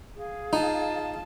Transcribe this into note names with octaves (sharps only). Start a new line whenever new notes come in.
G#4 F5
D#4 F4 A5